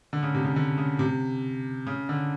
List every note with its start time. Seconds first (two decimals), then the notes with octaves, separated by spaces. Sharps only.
0.13 D3
0.23 C#3
0.34 C3
0.45 C#3
0.56 D3
0.78 C#3
0.99 C3
1.87 C#3
2.09 D3